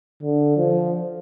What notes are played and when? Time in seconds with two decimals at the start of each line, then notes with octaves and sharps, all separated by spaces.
0.23 D3
0.57 F3